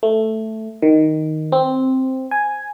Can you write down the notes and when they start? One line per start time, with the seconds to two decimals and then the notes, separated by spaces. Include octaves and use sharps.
0.03 A3
0.82 D#3
1.52 C4
2.31 G#5